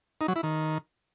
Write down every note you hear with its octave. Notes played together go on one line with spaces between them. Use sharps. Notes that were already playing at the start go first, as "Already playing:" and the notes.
D#4
F#3
E4
D#3